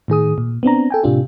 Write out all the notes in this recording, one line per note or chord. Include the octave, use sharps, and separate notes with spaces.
A2 D#3 G#4 D#6
A#2
B3 C4 D4 A#5
A4 G5 G#5
A2 C3 D4 F4 G4